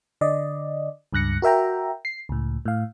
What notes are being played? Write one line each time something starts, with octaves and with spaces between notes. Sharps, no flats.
D3 D5 D#5
C#2 G2 F#6 A#6 C#7
F#4 A#4 E5 G5 A#5
C7
C#2 A2
A2 F5